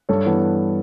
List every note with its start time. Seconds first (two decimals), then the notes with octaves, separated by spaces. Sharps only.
0.09 G2 A4 C#5
0.26 E3 B3